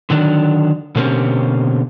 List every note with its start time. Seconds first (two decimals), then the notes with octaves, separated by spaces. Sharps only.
0.10 D3 D#3 F#3 D4
0.95 B2 D3 A#3 C4 C#4 G4